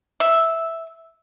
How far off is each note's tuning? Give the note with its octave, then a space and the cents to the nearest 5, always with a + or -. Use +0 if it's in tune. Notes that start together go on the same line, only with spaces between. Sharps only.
E5 -5